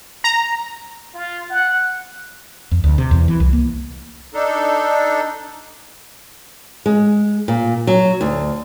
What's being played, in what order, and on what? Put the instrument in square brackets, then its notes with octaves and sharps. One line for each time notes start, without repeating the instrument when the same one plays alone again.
[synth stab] A#5
[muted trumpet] F4
F#5
[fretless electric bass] F2
D2
C3
E2
E3
C2
A#3
[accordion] D4 D#4 A4
[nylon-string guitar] G#3
A#2
F#3
D2